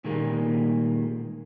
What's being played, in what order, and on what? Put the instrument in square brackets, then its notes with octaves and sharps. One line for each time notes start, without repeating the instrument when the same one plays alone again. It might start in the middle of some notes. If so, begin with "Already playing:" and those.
[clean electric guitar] A#2 D#3 G3 G#3 A#3